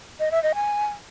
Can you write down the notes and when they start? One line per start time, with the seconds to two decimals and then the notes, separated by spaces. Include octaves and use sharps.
0.20 D#5
0.31 E5
0.43 D#5
0.55 G#5